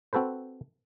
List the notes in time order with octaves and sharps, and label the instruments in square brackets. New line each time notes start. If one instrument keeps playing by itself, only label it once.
[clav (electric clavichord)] C4 F#4 A4 B4 C5